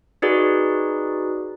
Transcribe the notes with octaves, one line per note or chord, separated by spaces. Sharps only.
D#4 F#4 G#4 B4 D5